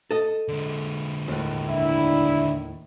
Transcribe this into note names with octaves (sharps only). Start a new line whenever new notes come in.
A4 D#5
D3 G#3
D#2 A2
D4 E4